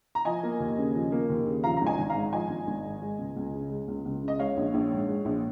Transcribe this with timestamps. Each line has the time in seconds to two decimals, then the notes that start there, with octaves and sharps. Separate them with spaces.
0.15 A#5
0.25 F3 D#5 G#5
0.43 A#3
0.60 D#2
0.78 C#3
0.95 F3
1.12 A#3
1.29 D#2
1.46 C#3
1.64 F3 F5 A#5
1.77 G#1 A#5
1.87 D#5 G#5
1.98 G#1
2.10 F5 A#5
2.15 G#2
2.33 F3 D#5 G#5
2.50 G#1
2.67 G#1
2.84 G#2
3.02 G#3
3.19 C#2
3.36 C#2
3.54 C#3
3.70 G#3
3.88 C#2
4.05 C#2
4.23 C#3
4.28 D#5
4.39 G#3 C#5 F5
4.57 A#1
4.74 A#1
4.91 G#2
5.08 G#3
5.25 A#1